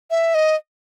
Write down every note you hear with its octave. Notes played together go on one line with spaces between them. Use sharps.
E5
D#5